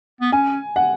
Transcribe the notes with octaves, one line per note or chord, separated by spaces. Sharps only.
B3
C#4 G#5
F#5